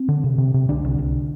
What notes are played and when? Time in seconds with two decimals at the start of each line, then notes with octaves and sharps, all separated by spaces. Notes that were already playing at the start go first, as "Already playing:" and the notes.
Already playing: C4
0.09 D3
0.24 C3
0.38 C3
0.54 C3
0.69 C2 D3 D4
0.84 C2
0.99 C2